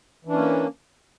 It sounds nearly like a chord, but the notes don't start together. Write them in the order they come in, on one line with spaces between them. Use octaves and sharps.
E3 D4 C#4 A#3